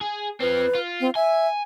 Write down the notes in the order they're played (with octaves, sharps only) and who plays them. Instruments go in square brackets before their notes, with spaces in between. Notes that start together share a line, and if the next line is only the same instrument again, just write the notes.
[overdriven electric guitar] G#4
[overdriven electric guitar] F3 C4 [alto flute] B4
[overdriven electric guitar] F4
[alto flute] C4
[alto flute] E5 [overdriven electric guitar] G#5